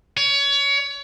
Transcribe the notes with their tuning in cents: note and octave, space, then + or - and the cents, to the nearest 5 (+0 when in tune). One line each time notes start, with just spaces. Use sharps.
C#5 +25